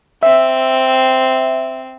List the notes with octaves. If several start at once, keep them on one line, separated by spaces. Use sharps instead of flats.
C4 E5